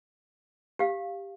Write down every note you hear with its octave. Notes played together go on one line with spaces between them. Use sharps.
G4 F5